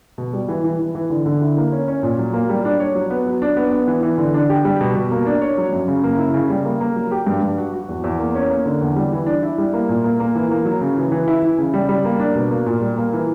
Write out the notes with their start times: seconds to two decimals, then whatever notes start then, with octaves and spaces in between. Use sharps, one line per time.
0.18 B2
0.33 G3
0.49 E3
0.64 E3
0.79 E3
0.95 E3
1.10 D3
1.26 D3
1.41 E4
1.57 A#3
1.72 C#4
1.88 C#4
2.03 A#2
2.19 F#3
2.33 A#3
2.49 G3
2.65 D4
2.80 C#5
2.95 F#3
3.10 B3
3.26 F#3
3.42 D4
3.56 B3
3.72 B3
3.87 E3
4.03 E3
4.18 D3
4.34 D4
4.49 G4
4.65 G3
4.81 B2
4.95 B2
5.11 A#3
5.27 D4
5.41 C#5
5.58 F#3
5.73 F#2
5.88 C#3
6.03 A#3
6.18 E4
6.34 C#3
6.50 G3
6.65 A#3
6.81 A#3
6.96 F#3
7.11 G4
7.27 G2
7.43 G2
7.57 F#4
7.73 F#4
7.89 E2
8.04 E2
8.19 A#3
8.35 C#4
8.50 A#3
8.66 D3
8.82 E2
8.96 G3
9.12 E3
9.27 D4
9.43 E4
9.58 G3
9.73 A#3
9.89 A#2
10.04 A#3
10.20 A#3
10.35 E3
10.51 A#3
10.65 F#3
10.81 C#3
10.97 E3
11.12 E3
11.28 E4
11.42 E3
11.58 C#3
11.74 G3
11.89 G3
12.05 A#3
12.20 D4
12.36 B2
12.51 A#3
12.66 A#2
12.81 G3
12.97 A#3
13.13 E3